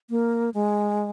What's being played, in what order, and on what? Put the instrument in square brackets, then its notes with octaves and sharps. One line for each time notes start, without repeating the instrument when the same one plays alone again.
[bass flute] A#3
G#3